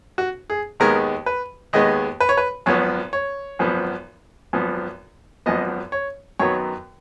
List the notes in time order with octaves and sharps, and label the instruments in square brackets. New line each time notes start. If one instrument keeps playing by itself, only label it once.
[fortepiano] F#4
G#4
D#2 D#3 G#3 B3 A#4
B4
D#2 D#3 G#3 B3 D#5
B4
C#5
B4
G#1 F#2 F3 B3 C#5
C#5
G#1 F#2 F3 B3
G#1 F#2 F3 B3
G#1 F#2 F3 B3 D#5
C#5
F#2 D#3 F#3 B3 C#5